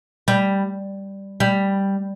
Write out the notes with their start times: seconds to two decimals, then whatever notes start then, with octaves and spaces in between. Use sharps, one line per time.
0.28 G3
1.40 G3